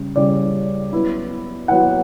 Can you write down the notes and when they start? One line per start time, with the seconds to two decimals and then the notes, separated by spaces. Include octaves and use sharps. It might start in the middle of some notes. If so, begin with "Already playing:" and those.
Already playing: C#3 G3 C#4
0.16 C#3 G3 C#4 D5
0.93 F#3 B3 E4
1.68 F#3 B3 E4 F#5